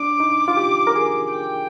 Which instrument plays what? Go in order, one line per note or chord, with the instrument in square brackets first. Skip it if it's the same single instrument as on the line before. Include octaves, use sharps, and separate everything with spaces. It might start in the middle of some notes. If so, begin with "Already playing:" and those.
Already playing: [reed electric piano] D4 [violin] D6
[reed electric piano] D#4
F4
G4
A#4
G#4
[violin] G5